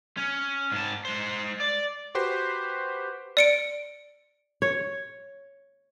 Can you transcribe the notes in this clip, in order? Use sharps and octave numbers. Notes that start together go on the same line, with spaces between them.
C#4
G#2 A5
G#3 C5
D5
F#4 G4 B4 C5 C7
D5 C#7 D7
C#5